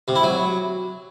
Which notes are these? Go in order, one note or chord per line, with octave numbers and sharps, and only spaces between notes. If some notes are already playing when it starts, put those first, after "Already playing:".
C3
E4
F#3